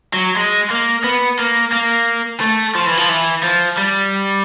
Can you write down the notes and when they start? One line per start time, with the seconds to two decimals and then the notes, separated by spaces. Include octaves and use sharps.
0.14 F#3
0.37 G#3
0.71 A#3
1.04 B3
1.39 A#3
1.73 A#3
2.41 A3
2.75 F3
2.86 E3
2.97 F3
3.09 E3
3.43 F3
3.78 G3